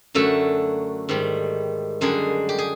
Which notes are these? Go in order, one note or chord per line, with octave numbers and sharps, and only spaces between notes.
F#2 D3 F#3 A3 A4
G#2 D#3 G3
F#2 D3 G3 G#3 G#4
G4
G#4